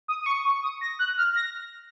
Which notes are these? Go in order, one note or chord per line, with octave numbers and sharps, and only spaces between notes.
D#6
D#6
C#6
C#6
D#6
A#6
F#6
F6
A#6